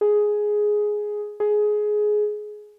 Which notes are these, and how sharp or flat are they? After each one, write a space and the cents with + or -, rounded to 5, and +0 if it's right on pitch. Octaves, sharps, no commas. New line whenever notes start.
G#4 +5
G#4 +15